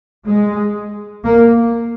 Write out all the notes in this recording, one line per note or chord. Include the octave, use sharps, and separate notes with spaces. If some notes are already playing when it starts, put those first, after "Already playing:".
G#3
A#3